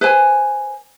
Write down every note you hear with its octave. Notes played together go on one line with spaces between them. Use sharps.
B4 C5 G#5